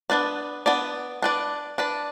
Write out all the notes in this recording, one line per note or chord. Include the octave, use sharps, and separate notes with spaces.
B3 D4 B4 D5
B3 D4 B4 D5
D4 B4 D5
D4 B4 D5